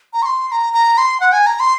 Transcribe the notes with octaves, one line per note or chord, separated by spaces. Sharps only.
A#5
C#6
C6
C6
A#5
A#5
C6
F#5
G#5
A#5
C6